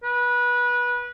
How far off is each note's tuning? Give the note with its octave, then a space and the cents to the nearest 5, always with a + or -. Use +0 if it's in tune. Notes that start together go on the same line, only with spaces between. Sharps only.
B4 -20